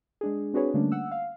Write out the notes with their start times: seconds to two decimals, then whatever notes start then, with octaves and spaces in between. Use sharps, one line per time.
0.21 G#3 D4 G#4
0.54 C4 D4 F#4 G#4 B4 C#5
0.74 D3 G3 A3 A#3 C#4 D4
0.92 F#5 E6
1.11 F5